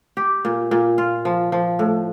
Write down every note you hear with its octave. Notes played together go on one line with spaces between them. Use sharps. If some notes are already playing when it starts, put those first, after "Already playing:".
G4
A#2
A#2
F4
F3
F3
A2